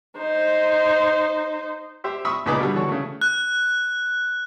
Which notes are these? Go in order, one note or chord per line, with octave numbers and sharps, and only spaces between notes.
D#4 C5
G4 C5 E5
E5 B5 C#6 D#6 E6
C#2 A#2 D#4 G#4 B4 D6
B2 D3 G3
E3 F#4 A4 C#5
C#3 A3
F#6